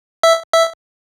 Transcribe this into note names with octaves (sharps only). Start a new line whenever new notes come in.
E5
E5